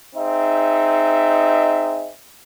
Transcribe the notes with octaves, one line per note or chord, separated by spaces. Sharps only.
C4 D#4 G#4 D#5 E5